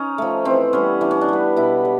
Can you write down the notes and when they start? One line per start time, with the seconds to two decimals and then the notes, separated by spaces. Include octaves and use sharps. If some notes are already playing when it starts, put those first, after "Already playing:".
Already playing: C#4 D#4
0.18 F3 A3
0.45 E3 C4
0.73 G3 B3 C#4
1.01 E3 D4
1.11 C#4
1.21 D4
1.28 G3 B3
1.56 B2 E4
1.85 G3